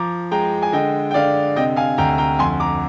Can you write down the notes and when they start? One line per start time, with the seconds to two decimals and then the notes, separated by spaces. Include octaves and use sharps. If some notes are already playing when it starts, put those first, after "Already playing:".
Already playing: F3 A#5 D6
0.31 G#3 G5 A#5
0.63 G#5
0.72 D3 D#5 G5
1.11 G5
1.14 D3 D5 F5
1.56 C3 D#5 G5
1.76 F5 G#5
1.98 D2 G5 A#5
2.18 G5 A#5
2.39 F2 G#5 C6
2.60 A#5 D6